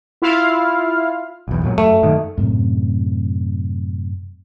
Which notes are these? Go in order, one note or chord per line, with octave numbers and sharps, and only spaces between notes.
E4 F4 F5
B1 E2
F2 A#2 F#3
F#2 A3
F#2 A#2 D#3
F#2 A2 C3